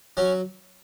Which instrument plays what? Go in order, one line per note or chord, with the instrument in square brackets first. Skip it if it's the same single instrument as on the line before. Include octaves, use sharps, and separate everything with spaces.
[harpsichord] F#3 C#4